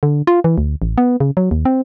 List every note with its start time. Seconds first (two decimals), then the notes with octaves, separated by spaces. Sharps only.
0.03 D3
0.27 F4
0.44 E3
0.58 D2
0.82 A1
0.98 B3
1.20 C#3
1.37 F#3
1.51 D#2
1.65 C4